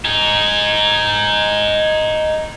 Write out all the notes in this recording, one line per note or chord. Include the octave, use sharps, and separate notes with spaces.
D#4 G#4